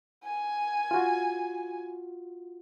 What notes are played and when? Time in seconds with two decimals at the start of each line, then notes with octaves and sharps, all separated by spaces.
0.24 G#5
0.91 F4 F#4